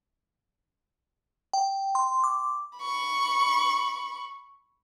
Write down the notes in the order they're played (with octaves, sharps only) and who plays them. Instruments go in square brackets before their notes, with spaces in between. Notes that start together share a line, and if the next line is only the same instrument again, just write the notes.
[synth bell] G5
C6
D6
[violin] B5 C#6